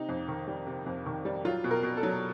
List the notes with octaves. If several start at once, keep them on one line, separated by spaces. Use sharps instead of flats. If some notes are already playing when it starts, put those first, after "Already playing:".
Already playing: C3 D#4
F2
D#3
G3
C3
F2
D#3
G3
F#3 F4
B2
A#4
B2
A4
F#3